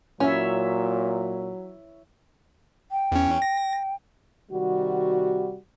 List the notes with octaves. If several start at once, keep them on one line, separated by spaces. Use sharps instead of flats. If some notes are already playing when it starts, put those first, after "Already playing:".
A#2 F#3 C#4 E4 C#5 E5
G5
E2 C#4
A#6
C3 D#3 G3 F#4